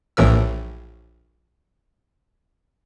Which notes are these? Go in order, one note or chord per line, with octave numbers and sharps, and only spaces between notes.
A#1 A2 E3 A#4 E6